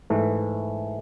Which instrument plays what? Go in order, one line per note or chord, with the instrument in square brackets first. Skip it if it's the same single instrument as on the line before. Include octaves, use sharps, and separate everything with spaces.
[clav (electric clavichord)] G#2 E3 A3